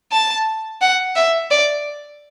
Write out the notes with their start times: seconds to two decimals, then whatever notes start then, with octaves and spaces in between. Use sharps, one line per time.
0.12 A5
0.81 F#5
1.16 E5
1.51 D5